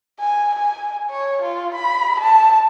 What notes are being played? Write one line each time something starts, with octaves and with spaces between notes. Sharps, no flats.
G#5
G#5
C#5
F4
B5
A5